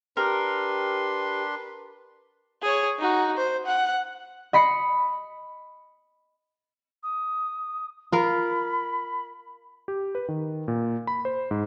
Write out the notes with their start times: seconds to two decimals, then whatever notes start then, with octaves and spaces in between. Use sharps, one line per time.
0.17 D4 G4 A#4 B4 C6
2.62 G#4 C#5
2.99 D#4 F#4
3.37 C5
3.66 F#5
4.53 D#5 B5 C7 C#7
7.03 D#6
8.12 F4 A#4 B5
9.88 G4
10.15 B4
10.28 D#3
10.68 A#2
11.07 B5
11.25 C5
11.51 G#2